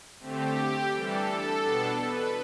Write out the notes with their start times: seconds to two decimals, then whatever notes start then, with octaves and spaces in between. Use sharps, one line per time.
0.20 D3 A3 C4 G4
0.92 E3 G3 D4 A4
1.63 B2 B3 D4
1.98 B4